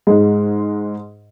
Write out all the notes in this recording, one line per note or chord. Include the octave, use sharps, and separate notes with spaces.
G#2 G#3